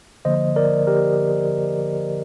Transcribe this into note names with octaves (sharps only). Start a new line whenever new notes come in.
D3 F3 A#3 C5 D#5
A#4 D5
G4 A#4